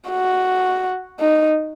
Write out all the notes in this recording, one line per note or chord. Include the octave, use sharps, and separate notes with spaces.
F#4
D#4